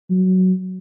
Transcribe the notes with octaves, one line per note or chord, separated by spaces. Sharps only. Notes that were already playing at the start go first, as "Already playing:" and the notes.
F#3